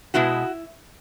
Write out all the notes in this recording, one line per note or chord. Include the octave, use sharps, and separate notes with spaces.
B2 G#3 B3 E4 F#4